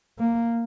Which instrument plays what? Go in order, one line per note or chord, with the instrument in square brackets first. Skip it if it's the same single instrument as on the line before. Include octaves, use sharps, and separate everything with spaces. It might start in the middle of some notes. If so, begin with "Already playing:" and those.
[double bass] A#3